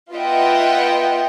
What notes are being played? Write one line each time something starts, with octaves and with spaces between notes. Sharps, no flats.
B3 F4 D#5 E5 F#5 G5